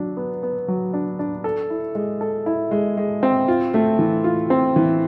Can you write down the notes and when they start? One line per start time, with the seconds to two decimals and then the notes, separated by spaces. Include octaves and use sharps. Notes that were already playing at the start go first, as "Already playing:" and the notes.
Already playing: F#3 D4
0.17 B3
0.43 B3
0.68 F#3
0.93 D4
1.19 D4
1.44 A4
1.70 E4
1.95 G#3
2.21 A4
2.46 E4
2.71 G#3
2.97 G#3
3.23 C4
3.48 F4
3.74 A3
3.99 E3
4.24 F4
4.50 C4
4.76 E3